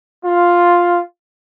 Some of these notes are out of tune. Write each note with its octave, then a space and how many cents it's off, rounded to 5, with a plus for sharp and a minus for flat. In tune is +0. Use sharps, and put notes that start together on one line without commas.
F4 +5